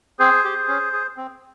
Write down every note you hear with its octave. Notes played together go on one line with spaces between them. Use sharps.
C4 G#4 C5
G4
C#4
G#4
C4